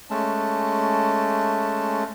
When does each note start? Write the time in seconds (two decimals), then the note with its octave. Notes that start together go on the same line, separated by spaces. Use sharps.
0.10 G#3 A3 C#4 A5